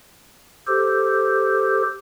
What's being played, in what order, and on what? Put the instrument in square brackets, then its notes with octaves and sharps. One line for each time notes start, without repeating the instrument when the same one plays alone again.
[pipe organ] G4 A4 C5